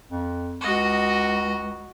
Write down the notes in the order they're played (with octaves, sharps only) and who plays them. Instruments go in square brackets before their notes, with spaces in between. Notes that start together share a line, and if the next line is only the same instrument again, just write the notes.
[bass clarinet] F2
[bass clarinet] C#2 [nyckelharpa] F#4 D#5